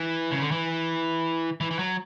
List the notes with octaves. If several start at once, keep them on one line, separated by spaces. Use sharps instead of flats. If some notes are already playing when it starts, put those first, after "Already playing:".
Already playing: E3
C#3
D3
E3
E3
E3
F#3